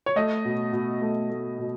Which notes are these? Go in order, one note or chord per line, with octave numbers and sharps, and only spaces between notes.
C#5
A3 D#5
B2
B2
A3
A3
B2